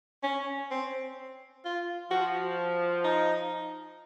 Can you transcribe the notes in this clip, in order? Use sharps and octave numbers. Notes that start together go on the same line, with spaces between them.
C#4
C4
F4
F3 F#4
D#4